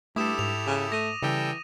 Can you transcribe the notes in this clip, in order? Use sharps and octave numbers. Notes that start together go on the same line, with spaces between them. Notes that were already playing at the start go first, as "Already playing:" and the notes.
G2 A3 E4 G4 A4 D6 D#6 E7
G#2 F7
C#3
A3 A#6 D#7
C#3 E3 G3 A4 G5